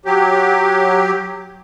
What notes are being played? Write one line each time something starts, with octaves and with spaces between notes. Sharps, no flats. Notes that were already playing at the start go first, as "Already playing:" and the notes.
F#3 G4